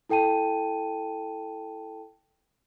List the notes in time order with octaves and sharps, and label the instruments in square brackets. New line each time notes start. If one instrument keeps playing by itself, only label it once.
[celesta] E4 A4 G5 A5 D#7